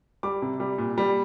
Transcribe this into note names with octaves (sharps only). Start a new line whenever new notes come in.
G3 D6
C3
G3
A#2
G3